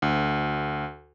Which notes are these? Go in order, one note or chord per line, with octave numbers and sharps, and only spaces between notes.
D2